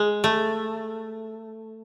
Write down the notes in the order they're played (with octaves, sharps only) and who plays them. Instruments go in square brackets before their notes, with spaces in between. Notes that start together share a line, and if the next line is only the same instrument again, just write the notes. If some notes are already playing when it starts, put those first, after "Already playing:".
Already playing: [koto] G#3
A3